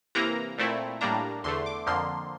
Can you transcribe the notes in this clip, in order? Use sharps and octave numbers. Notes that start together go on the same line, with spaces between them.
C3 E3 A#3 A#5
A#2 A3 C4 E4
A2 G3 A#3 D4 A#5
E2 D3 A3 C6
D6
F2 D3 F3 A#3 C6